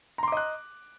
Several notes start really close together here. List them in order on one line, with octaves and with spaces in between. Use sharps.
A#5 C6 D6 D#5 F#6